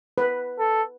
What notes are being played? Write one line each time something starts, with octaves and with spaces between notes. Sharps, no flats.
B4
A4